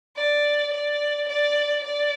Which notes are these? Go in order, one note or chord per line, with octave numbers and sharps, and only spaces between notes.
D5
D5
D5
D5